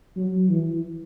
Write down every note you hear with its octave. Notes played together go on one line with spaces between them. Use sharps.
F#3
E3